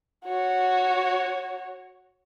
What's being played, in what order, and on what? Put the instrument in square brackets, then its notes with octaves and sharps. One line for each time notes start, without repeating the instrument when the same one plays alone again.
[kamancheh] F#4 C#5